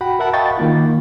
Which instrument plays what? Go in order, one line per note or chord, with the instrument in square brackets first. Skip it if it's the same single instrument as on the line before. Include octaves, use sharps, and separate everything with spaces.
[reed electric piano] F#4 F#5 G5 B5
A#4 E5 F#5 A5 B5
D#5 F5 G5 B5 C#6 A6
D#3 A#3 F4